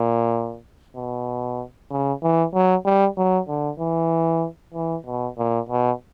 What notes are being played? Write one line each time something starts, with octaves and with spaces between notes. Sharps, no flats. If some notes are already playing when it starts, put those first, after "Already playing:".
Already playing: A#2
B2
C#3
E3
F#3
G3
F#3
D3
E3
E3
B2
A#2
B2